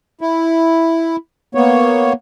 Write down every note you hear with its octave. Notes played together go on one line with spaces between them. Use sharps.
E4
A#3 B3 C#5